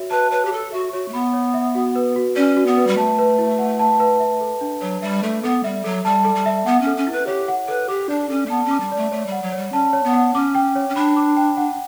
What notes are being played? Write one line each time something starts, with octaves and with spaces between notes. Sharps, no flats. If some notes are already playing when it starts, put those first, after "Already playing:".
Already playing: F#4 C#5 E5
B4 A5
B4 C#5
G4
A4 C#5
F#4 E5
F#4 C#5
A3
B3 B5
C#5
E5
F#4
B4
F#4
C#4 D5
F#4
B3
B4
G3
A3 A5
B4
E4
F#5
A5
B4
E5
A4
D4
F#3 C#5
G3 E5
A3 A4
B3 A4
G3 E5
F#3 A4
G3 A5
A4
G3
E5
B3 F#5
C#4
A4
C#4
E4
B4
G4 C#5
F#5
A4 B4
G4 D6
D4 D5
C#4 A4
A3
B3 A5
C#4
D6
G3
A3 D5
A3 C#5
G3
F#5
F#3
G3 C#5
C#4 A5
C#5
B3
F#5
C#4 D6
G5
C#5
C#4
D4 B5
D6
G5
F#5